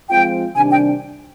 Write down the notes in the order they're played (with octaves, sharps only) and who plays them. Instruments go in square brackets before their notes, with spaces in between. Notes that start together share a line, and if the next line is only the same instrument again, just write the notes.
[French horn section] F3 G#3 C4 F4 [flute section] G5
[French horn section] C3 D#3 G3 D4 [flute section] G#5
[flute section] G5